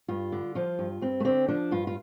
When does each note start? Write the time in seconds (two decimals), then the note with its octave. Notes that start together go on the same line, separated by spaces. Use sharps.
0.08 G2 F4
0.32 D3
0.55 F3 F4
0.79 G2
1.01 G2 C4
1.20 A3
1.25 D3 C4
1.48 F3 D4
1.71 G2 F4
1.87 F4